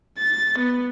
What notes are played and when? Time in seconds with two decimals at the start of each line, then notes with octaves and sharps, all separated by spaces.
0.19 A6
0.59 B3